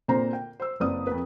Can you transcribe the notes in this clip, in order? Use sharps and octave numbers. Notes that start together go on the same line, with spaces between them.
A#2 D3 C4 C5 A#5
G5
C5 E6
F#1 C4 B4 D5 D#6
F2 B4